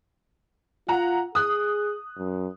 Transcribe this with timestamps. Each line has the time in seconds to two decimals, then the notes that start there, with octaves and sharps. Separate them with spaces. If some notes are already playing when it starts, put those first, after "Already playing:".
0.88 F4 F#5 A#5
1.35 G#4 D#6 F#6
2.18 F#2